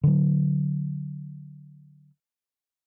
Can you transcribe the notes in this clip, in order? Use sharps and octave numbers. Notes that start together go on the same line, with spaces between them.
D3 F#3